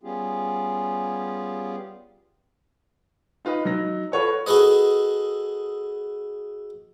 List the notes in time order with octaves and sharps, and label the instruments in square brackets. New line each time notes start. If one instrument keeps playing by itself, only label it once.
[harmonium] G3 B3 C#4 F4 G4 G#4
[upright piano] D#4 F4 B4 D#5
F#3 D#4 A#6
F4 A4 B4 C#5 F#5 C#6
[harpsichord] F#4 G#4 A4 B4 D#5